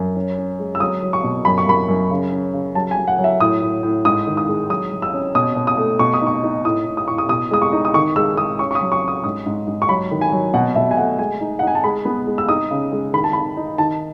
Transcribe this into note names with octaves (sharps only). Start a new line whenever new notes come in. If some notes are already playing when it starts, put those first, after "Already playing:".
Already playing: F#2
C#4
C#4
G#3
E6
F#3 D#6
F#3
C#6
B2
F#2 B5
C#6
F#2 B5
F#2
C#3
C#4
C#3
F#3 A5
G#5
F#3
F#5
F#3
E5
A2 D#6
A2
A2
G#2 D#6
D#3
D#6
G#3
F#3 D#6
F#3
E6
C#4
B2 D#6
B2
D#6
A3
B2 C#6
D#6
D#4
C#6
D#4
A2 D#6
A2
D#6
A2 C#6
D#6
B2 D#6
G#3 D#6
C#6
D#4
D#6
D#3 C#6
G#3 E6
G#3 D#6
C#4 C#6
C#6
D#6
F#3
C#6
C#4 D#6
G#2 D#6
G#2
G#2
C#6
F#3 B5
D#3
G#5
F#3
B2 F#5
B2 E5
G#5
A3 F#5
G#3 G#5
D#4
D#4 F#5
G#5
A5
G#3 B5
B3
G#3
E6
D#4 D#6
C#3
G#3
D#3 B5
A5
D#3 B5
D#4
D#3 A5